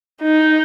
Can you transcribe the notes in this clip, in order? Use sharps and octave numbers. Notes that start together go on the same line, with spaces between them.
D#4